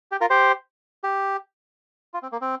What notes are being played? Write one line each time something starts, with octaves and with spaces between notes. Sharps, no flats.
G4
F4 A#4
G4 C5
G4
F4
C4
A#3
C4